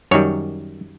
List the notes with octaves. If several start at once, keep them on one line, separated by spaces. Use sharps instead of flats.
F#2 D#3 G3 C#5